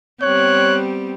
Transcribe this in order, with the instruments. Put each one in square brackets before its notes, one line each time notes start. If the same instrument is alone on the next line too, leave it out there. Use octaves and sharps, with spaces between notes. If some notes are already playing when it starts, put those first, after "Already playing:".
[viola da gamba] G3 B3 C4 [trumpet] C#5 [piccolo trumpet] F#6